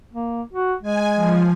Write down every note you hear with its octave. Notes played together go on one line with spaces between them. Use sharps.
A#3
F#4
G#3 G#5
F3